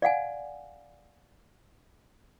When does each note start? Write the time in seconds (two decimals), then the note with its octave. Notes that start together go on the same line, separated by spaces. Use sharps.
0.02 D5 F5 F#5 G#5